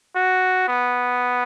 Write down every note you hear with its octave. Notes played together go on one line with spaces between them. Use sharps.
F#4
B3